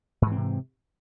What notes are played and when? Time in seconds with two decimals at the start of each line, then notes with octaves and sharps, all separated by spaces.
0.22 G#2
0.27 E3
0.32 C4
0.37 C3